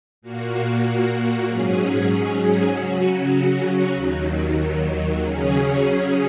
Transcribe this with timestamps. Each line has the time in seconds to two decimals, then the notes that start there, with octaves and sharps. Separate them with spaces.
0.22 A#2 A#3 F#4
1.46 G#2 F#3 C#4 G#4
2.71 C#3 F#3 C#4 F#4
3.95 D#2 D#3 F#3
5.18 C#3 F#3 C#4 G#4